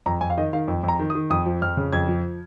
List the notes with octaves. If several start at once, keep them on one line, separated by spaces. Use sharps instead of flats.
F2 A#5
F2 G#5
F5
D#3 D#5
D#3 F5
F2
F2
A#5
D#3
D#6
D#3
F2 D#6
F3
F2 F6
C#3
F2 G#6
F3